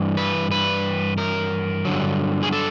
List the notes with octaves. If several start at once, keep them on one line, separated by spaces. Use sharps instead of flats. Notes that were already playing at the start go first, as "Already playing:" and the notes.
Already playing: G2 E3
B4
B4
A#4
G2 D3 F#3
G#4
A4